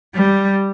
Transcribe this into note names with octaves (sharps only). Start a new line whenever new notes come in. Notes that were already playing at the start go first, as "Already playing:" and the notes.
G3